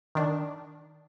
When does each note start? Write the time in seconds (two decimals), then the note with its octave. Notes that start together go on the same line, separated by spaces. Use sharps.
0.15 D#3 D4